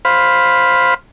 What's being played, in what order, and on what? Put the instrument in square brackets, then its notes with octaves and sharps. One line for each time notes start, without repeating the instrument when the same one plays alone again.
[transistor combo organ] C5 F5 B5